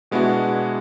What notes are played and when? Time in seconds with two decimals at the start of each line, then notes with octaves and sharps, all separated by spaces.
0.11 B2 G#3 B3 D4 E4 F#4